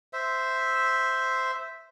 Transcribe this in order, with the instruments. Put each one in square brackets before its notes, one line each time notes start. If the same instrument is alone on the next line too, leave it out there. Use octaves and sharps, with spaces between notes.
[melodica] C5 E5